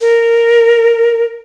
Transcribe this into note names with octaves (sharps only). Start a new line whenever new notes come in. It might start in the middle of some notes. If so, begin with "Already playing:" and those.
A#4